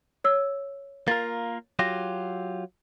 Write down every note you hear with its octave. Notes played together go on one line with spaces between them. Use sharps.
C#5 E6
A#3 F4 A#4 A6
F#3 F4 G4 A#6